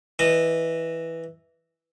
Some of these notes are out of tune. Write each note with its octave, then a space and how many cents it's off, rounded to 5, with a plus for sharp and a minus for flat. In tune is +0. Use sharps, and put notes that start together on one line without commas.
E3 -5 D#5 -15